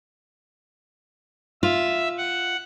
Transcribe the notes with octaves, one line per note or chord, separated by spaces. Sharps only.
F4 E5
F#5